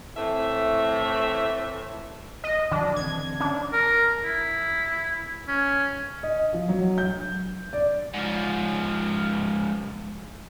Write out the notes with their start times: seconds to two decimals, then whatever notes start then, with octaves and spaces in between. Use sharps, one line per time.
0.16 A2 E3 A3 C4 E5
2.44 D#5
2.71 D#3 F3 F#3 D4
2.96 D3 E3 C4 G#6
3.40 C#4 D4
3.73 A#4
4.24 E4
5.48 C#4
6.23 D#5
6.53 F3
6.68 F#3
6.98 G6
7.73 D5
8.14 G#2 F3